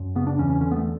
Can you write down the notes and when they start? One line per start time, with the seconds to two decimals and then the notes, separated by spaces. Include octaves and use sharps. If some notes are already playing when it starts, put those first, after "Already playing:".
Already playing: F#2
0.16 C#3 B3
0.27 D4
0.38 E2 C#4
0.50 C#4
0.61 D3 C#4
0.71 B3
0.77 A3